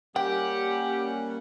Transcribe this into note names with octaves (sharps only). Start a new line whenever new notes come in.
G3 A#3 C#4 G4 F#5 G5